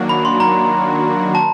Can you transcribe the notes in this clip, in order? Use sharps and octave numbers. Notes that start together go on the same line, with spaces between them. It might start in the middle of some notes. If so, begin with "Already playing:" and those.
Already playing: D#3 F#3 A#3 D4 F#4
B5
C6
A#5
A5